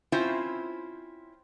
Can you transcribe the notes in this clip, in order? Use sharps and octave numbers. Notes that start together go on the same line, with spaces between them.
C4 C#4 E4 F4 C5